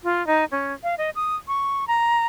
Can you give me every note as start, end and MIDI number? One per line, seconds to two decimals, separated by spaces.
0.04 0.25 65
0.27 0.44 63
0.51 0.73 61
0.83 0.95 77
0.98 1.10 75
1.15 1.36 87
1.48 1.87 85
1.88 2.27 82